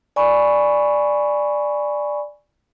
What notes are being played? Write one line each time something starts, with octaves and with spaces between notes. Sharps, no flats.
D5 G#5 B5 C#6